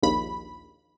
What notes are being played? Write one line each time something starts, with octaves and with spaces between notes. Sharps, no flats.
A#1 D#2 B5